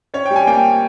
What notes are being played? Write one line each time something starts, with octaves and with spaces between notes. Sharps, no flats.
C#4 C#5
G3 G5
G#5
A#3 G5